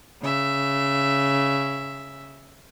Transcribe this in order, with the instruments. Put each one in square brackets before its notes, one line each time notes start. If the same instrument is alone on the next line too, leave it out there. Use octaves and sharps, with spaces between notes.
[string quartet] C#3 E5